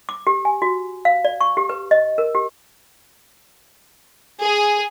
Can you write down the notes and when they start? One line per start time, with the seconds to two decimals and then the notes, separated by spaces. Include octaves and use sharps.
0.09 D6
0.27 G4
0.45 G#5
0.62 F#4
1.05 F5
1.25 D5
1.41 C#6
1.57 G4
1.69 B4
1.91 D#5
2.18 A#4
2.35 G4
4.42 G#4